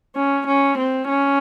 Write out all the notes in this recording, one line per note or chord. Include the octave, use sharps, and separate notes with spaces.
C#4
C#4
C4
C#4